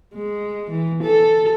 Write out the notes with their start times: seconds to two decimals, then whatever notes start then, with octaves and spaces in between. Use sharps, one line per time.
0.14 G#3
0.71 E3
1.03 A4